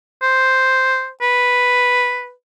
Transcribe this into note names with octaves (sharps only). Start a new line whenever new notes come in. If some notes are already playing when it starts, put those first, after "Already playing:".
C5
B4